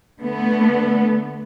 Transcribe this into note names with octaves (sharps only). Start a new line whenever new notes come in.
D3 A3 B3